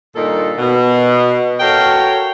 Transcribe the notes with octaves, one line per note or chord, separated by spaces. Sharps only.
G2 A#2 D#3 D#4 A4
B2
F#4 A4 A#4 C#5 F5 G5